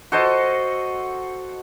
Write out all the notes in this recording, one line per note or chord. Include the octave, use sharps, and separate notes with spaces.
F#4 A4 C5 D#5